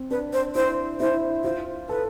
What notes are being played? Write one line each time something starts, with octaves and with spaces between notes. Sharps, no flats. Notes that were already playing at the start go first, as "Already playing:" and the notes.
Already playing: C4
D4 B4
C5
E4 C5
E4 C5
F4 C5
A4 B4